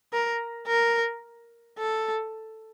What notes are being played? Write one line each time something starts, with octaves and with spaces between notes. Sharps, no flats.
A#4
A#4
A4